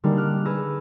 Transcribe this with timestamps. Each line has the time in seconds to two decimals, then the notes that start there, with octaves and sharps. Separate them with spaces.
0.04 D3 G3 G#3 A#3 D4 D#4
0.17 D6 F6 F#6
0.45 G#4 B4 E6 A#6 C#7